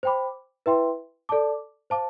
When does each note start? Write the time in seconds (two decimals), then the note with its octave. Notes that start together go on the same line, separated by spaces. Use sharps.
0.03 C5 G5 B5 D6
0.66 E4 B4 E5 G5 C6
1.29 A4 D5 A5 D6
1.90 C5 F5 A5 D6